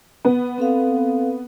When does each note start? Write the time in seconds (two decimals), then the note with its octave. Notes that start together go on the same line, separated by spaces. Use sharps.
0.25 B3
0.58 C4 A4 F5